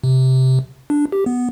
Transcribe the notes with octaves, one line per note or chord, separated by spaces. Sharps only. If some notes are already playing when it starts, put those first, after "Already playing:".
C3
D4
G4
B3